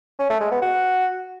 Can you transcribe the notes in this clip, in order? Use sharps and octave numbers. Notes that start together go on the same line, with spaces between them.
C#4
A3
G#3
B3
F#4